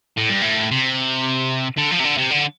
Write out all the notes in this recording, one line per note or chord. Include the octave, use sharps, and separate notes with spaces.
A2
G2
A2
C3
D3
F3
C3
D3
C3
D3